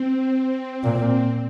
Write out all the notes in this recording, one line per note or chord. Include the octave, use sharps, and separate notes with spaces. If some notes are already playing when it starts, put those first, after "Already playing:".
Already playing: C4
A#2